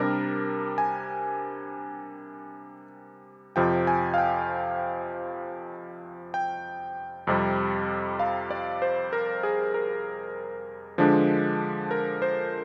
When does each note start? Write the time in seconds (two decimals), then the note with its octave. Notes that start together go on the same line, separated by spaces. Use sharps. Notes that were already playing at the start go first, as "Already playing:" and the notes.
Already playing: C3 G3 D4 A#4
0.78 G#5
3.56 F2 C3 F3 G5
3.87 G#5
4.14 F5
4.18 G5
6.34 G5
7.27 F2 C3 G3
8.19 F5
8.51 D5
8.82 C5
9.13 A#4
9.43 G#4
9.74 A#4
10.98 D3 F3 G#3 D4
11.91 A#4
12.22 C5